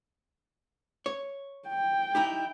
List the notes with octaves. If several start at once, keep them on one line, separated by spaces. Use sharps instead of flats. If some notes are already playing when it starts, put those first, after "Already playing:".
C#5
G5
D#4 E4 G4